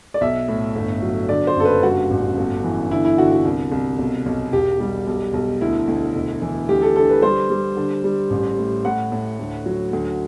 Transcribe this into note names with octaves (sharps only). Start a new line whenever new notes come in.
D5
B1 E5
A2
G1
F#3
D3 D5
C5
F#1 A4
B4
G2 F#4
A1
G1
E3
D3 E4
E4
D3 F#4
F#4
C2
C2
B1
B1
E1 G4
G3
B1
B1
D2 E4
D2
E1
E3
D2 G4
A4
D3 A4
B4
G3 C5
G3
D3
G3
A1
A2
A2 F#5
A2
D2
F#3
D2